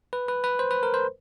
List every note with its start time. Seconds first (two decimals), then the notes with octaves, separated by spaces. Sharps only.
0.13 B4
0.28 B4
0.44 B4
0.59 C5
0.71 B4
0.83 A#4
0.94 C5